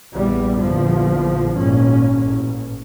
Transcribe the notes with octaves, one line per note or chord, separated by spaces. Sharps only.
A#1 E2 G3
A#1 E2 D3 F3
G#1 A#2 C#4
A1